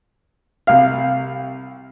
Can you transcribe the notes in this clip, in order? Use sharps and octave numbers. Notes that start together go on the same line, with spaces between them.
C2 F5